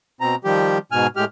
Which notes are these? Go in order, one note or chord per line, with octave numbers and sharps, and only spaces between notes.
B2 C4 A#5
D#3 F3 G3 G4
G#2 B2 G#5 F6
A2 G#3 G4 F6